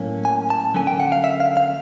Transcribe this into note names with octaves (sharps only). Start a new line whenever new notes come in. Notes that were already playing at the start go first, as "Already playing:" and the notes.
Already playing: A2 F#3 A#3 C#4
G#5
A5
D3 F#3 A#3 C#4 G#5
G5
F#5
F5
E5
F5
F5